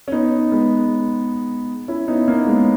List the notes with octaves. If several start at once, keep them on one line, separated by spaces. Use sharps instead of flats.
C#4
B3 D#4
G#3 B3
C#4 E4
B3 D#4
A#3 C#4
G#3 B3